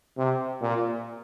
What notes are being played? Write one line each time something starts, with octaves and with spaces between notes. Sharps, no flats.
C3
A#2